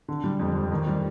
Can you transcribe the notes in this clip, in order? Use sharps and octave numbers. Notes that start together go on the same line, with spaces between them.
D3
G3
F2
F2
D#3
G3